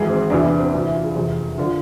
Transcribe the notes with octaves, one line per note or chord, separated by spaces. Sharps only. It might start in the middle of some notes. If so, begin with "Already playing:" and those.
Already playing: G#1 G#2 E3 G#4
C4
E2 C3 E3 D4
B3
C4
D2 C3 E3 D4
E4
F4
G#4
F1 E2 C3 F3
D3 F3 F4